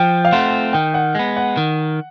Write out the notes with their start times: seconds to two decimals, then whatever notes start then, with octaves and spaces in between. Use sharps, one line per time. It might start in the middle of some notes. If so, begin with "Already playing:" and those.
Already playing: F3 G5
0.25 F5
0.32 A3 C4 F4 F#5
0.73 D#3 G5
0.94 F#5
1.15 G#3 B3
1.37 F#5
1.57 D#3